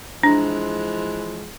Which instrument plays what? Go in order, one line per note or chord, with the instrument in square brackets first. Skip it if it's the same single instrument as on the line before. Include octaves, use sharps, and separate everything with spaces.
[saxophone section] E3 F3 G#3 [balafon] D4